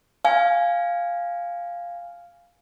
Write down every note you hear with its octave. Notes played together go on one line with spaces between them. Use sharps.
F5 G#5